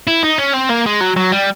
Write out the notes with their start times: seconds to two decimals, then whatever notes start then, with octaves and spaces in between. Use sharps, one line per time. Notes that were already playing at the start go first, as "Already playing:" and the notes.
0.07 E4
0.23 D#4
0.38 C#4
0.54 C4
0.70 A#3
0.86 G#3
1.01 F#3
1.16 F#3
1.32 G3